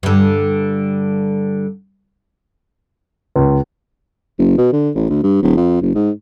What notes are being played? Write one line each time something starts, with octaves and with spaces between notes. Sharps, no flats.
G2 D3
C#2
F#1
B2
D3
A1
D2
G2
D#1
F2
F#1
G#2